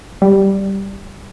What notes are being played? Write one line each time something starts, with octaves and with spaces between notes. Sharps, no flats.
G3